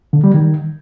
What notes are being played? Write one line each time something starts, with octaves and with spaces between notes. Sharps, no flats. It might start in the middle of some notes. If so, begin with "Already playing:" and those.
D3
G3
D#3